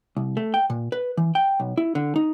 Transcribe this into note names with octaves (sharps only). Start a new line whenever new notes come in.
C2
A3
G5
A#2
B4
E3
G5
B1
E4
D3
D#4